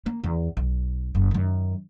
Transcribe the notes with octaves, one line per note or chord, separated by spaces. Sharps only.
A#3
E2
B1
F#1
F#2 D#3